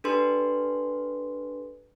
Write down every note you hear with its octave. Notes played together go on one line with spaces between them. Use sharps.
D4 G4 A4 B4 C6